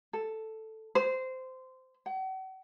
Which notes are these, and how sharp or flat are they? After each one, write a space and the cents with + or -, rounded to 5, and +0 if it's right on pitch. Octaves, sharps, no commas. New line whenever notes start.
A4 +0
C5 -15
F#5 +40